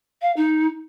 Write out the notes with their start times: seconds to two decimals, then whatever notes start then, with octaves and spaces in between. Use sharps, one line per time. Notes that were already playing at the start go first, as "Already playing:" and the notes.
0.21 F5
0.36 D#4